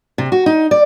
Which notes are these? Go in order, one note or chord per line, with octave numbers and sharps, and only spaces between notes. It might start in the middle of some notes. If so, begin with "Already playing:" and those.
C3
F#4
D#4
D5